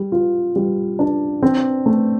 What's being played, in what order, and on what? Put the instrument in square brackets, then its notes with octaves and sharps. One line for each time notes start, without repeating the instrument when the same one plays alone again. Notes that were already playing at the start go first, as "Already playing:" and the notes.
Already playing: [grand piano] G3
F4
G3
D4
C4
A3